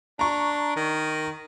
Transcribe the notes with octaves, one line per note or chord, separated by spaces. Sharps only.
D4 A#5 C#6
D#3